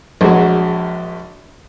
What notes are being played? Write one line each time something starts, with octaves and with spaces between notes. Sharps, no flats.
A#1 F#3 G#3 F#4